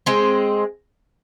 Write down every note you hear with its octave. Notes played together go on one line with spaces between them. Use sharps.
G#3 C4